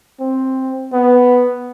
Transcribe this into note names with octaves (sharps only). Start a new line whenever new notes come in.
C4
B3